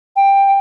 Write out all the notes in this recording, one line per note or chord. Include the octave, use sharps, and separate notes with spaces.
G5